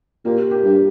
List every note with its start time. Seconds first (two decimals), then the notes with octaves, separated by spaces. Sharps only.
0.25 A#2 G4 A#4
0.51 G4 A#4
0.64 G2